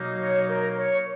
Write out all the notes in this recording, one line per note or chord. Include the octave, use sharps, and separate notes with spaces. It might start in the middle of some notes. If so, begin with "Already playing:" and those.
Already playing: B2 F#3 A#3 D#4
C#5
A#4
C#5